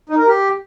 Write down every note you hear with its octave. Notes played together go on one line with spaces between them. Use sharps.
D#4
A#4
G4